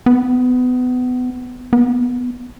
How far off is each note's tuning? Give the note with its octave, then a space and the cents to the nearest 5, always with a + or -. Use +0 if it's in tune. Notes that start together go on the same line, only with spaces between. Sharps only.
B3 +25
B3 +0